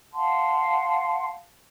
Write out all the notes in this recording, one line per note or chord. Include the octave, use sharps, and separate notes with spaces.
F5 F#5 A5 C6